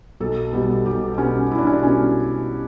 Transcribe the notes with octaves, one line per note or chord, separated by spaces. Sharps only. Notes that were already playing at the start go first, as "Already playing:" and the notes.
B1 A4
B2 G3 B3
B1 G4
B2 G3 B3 C#4
B1 E4
D4
C#4
D4
B2 G3 B3 C#4